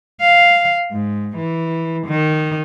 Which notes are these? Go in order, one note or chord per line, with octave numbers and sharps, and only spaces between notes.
F5
G#2
E3
D#3